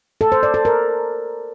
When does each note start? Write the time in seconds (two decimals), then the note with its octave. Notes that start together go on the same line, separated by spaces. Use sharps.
0.21 A4
0.32 C5
0.43 D5
0.54 A4
0.65 A#4